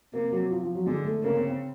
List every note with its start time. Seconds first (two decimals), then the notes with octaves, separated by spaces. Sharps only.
0.13 C3 A#3
0.32 F#3
0.50 F3
0.63 F3
0.75 F#3
0.86 D3 G#3
1.05 A3
1.23 C#3 A#3
1.36 C4
1.48 C4